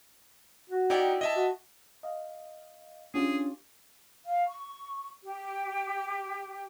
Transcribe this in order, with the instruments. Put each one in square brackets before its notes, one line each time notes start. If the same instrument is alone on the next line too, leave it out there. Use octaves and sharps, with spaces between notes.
[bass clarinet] F#4
[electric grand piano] D#4 [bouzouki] E4 G4 D5
[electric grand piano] D#5 E5 A5
[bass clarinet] F#4
[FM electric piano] D#5 F5
[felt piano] C#4 F4 G4 [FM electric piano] D4 [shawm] G#4
[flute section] F5
C#6
G4